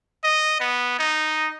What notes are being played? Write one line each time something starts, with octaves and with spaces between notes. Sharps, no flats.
D#5
B3
D#4